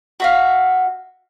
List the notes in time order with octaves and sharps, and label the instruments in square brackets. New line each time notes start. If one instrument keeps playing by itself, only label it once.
[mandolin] F#4 E5 F5